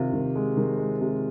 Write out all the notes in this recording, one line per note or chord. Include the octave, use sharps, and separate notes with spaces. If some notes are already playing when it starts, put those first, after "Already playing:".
Already playing: C3 D#3 F4
D#3
G#3
D#3
G#3
C3